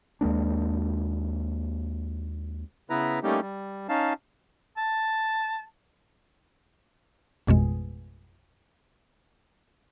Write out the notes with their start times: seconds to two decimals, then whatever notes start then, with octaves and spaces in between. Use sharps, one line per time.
0.21 D#2 G#3 A#3 D4
2.90 C#3 B3 E4 B4 A#5
3.23 G3 A3 A#3 C#4 D#4 G4
3.41 G3
3.89 C#4 D#4 F5 A5
4.77 A5
7.47 A1 F2 B2 G#3